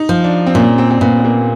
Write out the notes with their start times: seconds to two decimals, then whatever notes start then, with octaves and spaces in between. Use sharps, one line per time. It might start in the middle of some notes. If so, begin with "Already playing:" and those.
Already playing: D#4
0.09 F3
0.24 D4
0.47 C4
0.55 A#2 C#4
0.78 C4
0.91 C4
1.01 A#2 B3
1.20 B3
1.25 A#3